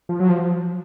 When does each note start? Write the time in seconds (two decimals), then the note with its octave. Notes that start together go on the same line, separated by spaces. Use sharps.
0.09 F3
0.20 F#3
0.29 F3